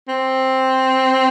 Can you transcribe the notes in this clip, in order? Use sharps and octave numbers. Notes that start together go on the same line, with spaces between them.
C4